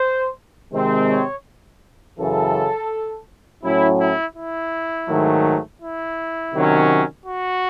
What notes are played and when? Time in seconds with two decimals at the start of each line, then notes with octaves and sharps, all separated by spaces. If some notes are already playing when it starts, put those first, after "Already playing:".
Already playing: C5
0.73 C3 D#3 G#3 C4
1.10 C#5
2.19 F#2 C#3 E3 A4
3.64 A2 F#3 C#4 E4
4.01 E4
4.36 E4
5.09 G#2 D#3 F#3 A3
5.81 E4
6.53 C3 D#3 F#3 C#4
7.26 F#4